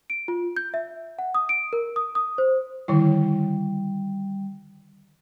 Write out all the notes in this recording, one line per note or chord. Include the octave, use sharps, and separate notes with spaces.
D7
F4
G6
E5
F#5
D#6
D7
A#4
D#6
D#6
C5
D3 D#3 G3 E4